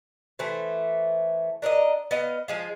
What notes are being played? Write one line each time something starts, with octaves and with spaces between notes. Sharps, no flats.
E3 A3 C5
D4 A#4 D5 D#5
B3 D#5 F5
F3 G#3 F4